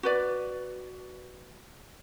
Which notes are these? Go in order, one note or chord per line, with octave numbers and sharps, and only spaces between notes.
F#4 B4 D5